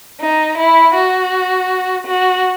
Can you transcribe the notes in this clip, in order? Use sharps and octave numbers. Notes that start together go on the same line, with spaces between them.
D#4
E4
F#4
F#4